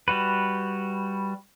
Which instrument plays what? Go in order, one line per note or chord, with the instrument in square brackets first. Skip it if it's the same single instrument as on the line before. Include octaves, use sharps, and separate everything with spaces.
[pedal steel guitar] G3 F#4 B4